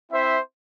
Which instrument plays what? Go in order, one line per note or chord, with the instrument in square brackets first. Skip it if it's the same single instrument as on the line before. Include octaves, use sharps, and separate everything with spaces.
[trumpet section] C4 E4 C5 E5